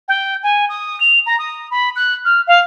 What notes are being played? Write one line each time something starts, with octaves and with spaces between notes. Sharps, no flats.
G5
G#5
D#6
F7
A#5
D#6
B5
F#6
F6
F5